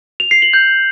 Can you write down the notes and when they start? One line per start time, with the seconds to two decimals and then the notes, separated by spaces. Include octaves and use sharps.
0.20 F7
0.31 C7
0.42 F#7
0.53 G6